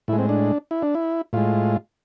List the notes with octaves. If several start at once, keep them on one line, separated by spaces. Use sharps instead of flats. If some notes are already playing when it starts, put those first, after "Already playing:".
A2 G#3 E4
C4
D4
E4
D4
E4
A2 G#3 F4